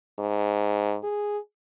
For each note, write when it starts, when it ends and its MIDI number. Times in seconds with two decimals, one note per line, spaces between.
0.19 0.97 44
1.04 1.38 68